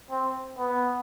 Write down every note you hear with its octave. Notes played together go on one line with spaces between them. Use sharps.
C4
B3